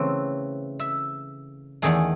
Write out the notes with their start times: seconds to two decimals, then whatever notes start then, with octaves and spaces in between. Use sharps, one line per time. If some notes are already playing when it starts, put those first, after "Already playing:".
Already playing: C#3 E3 A3 C4 C#5
0.80 E5
1.82 E2 D#3 A3 G#4